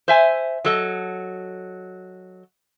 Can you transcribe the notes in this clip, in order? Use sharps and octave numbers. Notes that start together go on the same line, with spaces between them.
C5 E5 G#5
F#3 A4 D#5